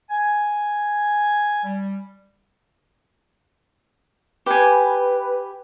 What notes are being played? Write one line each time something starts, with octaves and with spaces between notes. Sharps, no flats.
G#5
G3
G4 B4 G#5